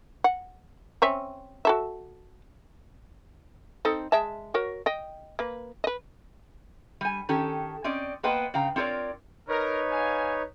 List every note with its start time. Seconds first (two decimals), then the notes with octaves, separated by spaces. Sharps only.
0.24 F#5
1.02 C4 C#4 E5
1.65 F#4 A4 E5
3.85 C4 D#4 A4
4.12 G#3 E5 A5
4.54 F#4 A#4 C#5
4.86 D#5 G5
5.39 A#3 B4
5.84 B4 D#5
7.01 G3 G#5
7.29 D#3 C#4 G4 A4
7.84 C4 C#4 D5 D#5
8.23 A#3 B3 B4 C5 D#5 G5
8.54 C#3 F5 G5 A#5
8.76 C4 F4 A#4 C#5 D5
9.48 D#4 A#4 B4 C#5
9.91 F5 G#5